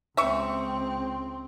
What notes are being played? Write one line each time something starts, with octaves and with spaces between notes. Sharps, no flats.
C#2 C4 E5 C#6